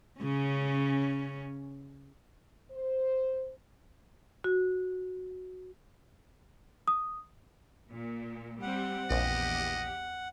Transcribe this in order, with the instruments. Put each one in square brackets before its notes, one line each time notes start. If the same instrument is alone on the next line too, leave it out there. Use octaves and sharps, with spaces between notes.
[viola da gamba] C#3 C#4
[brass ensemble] C5
[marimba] F#4
[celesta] D#6
[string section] A#2
[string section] G3 C4 [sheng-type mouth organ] F#5
[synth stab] A#1 [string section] E2 G4 [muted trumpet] D#5